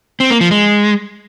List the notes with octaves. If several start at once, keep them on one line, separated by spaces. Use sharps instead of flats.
C4
A#3
F3
G#3